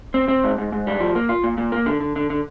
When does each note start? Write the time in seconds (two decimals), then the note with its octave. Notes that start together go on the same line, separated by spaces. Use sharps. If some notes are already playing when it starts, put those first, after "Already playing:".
0.14 C4
0.28 C4
0.44 G#2
0.58 G#2
0.72 G#2
0.87 G3
1.00 F3
1.15 A#3
1.29 F4
1.44 A#2
1.58 A#2
1.72 A#3
1.86 D3
2.00 D3
2.16 D3
2.30 D3